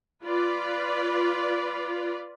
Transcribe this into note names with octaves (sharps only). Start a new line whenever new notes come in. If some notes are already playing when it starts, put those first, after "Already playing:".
F4 B4 D5